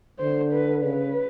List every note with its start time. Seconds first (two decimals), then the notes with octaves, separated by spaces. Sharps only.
0.19 D3 C5
0.52 B4
0.84 C#3 B4